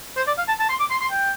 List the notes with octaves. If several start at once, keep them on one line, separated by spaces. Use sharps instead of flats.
C5
D5
F5
A5
A5
C6
D6
C6
C6
G5